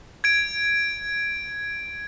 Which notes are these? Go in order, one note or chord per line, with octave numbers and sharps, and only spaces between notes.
G#6 D7